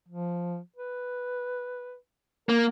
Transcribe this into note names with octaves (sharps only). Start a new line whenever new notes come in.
F3
B4
A#3 A#4